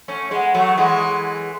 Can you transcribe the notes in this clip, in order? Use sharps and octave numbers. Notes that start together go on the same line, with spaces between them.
A3 C#4
G#3 B3
F#3 A3
E3 G#3